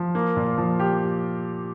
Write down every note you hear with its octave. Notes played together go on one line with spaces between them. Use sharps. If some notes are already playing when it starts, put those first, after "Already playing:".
Already playing: F3
A#3
A#2
F3
G4